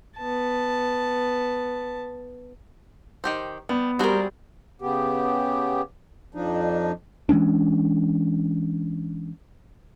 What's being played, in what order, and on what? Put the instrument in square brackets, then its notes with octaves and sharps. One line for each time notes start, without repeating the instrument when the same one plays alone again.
[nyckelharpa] B3 A5
[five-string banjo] D#3 G4 C5
[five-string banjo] G3 [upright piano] B3
[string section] G3 [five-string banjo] C4 F#4 G#4 [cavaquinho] A#4 C5
[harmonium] C#3 B3 G4
F2 F3 D4 D#4
[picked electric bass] E3 G#3 C#4 D4